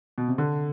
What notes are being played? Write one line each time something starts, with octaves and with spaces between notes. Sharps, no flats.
B2
C3
D3